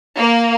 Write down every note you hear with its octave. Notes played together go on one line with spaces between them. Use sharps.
A#3